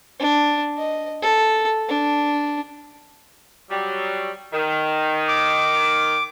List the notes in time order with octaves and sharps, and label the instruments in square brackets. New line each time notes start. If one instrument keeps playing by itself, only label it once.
[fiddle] D4
D#5
A4
D4
[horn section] F#3 G3
D#3
[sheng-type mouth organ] D6